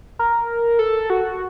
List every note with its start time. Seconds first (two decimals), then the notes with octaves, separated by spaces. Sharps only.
0.19 A#4
0.79 A4
1.10 F#4